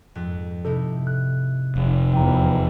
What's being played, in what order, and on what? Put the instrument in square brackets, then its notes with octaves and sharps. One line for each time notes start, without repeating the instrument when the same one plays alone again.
[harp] F2 G#2
[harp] C3 D#4 E4 [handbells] A4
[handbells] F#6
[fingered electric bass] F1
[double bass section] E2 E3 F3 [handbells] G5 A#5